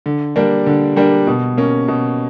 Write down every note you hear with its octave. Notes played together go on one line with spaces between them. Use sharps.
D3
G3 A#3 D4
D3
G3 A#3 D4
B2
A#3 C#4
B2